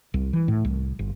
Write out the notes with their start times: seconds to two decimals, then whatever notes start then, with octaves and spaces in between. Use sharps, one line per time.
0.14 C2
0.33 E3
0.48 A2
0.65 C2
0.99 G1